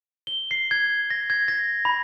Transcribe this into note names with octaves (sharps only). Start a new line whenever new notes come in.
G7
C7
G#6
A#6
G#6
A#6
B5